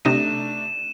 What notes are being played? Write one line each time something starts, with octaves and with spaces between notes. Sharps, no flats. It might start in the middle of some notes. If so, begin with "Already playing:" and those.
C3 A3 D4 D#4 A#6 D#7 E7